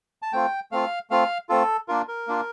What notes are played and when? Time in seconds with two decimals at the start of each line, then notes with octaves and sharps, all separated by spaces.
0.22 A5
0.33 A3 C4 F4 G5
0.72 A3 C4 F4 F5
1.10 A3 C4 F4 F5
1.49 A3 C4 F4 A4
1.88 A#3 D4 F4 A#4
2.08 A#4
2.27 A#3 D4 F4